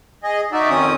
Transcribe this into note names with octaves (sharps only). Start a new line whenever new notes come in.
G#4 D#5
D#4 F#4 D5 E5
F2 D#3 C4 C#4 D#6